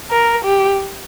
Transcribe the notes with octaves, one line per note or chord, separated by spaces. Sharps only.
A#4
G4